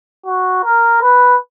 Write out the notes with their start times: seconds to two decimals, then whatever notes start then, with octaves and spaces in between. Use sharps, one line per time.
0.26 F#4
0.64 A#4
1.02 B4